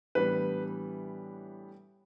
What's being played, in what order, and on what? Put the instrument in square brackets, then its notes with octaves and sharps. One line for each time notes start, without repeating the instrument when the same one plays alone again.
[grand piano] A2 E3 G3 B3 D4 B4